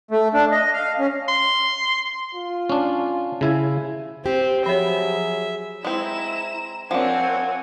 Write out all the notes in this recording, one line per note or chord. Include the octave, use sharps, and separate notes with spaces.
A3
D4
D#5
F5
C#4
C6
F4
C#4 D4
C#3 E4 G#5
C4 G4
F3 F#3 G#4 C#5 E5
G#3 C4 E4 A#5 E7
F3 C4 D4 A#4 C#5 F#5 G#5